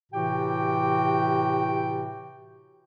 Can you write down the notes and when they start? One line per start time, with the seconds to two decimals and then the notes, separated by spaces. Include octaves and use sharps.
0.12 A2 C3 E3 F#4 G4 G5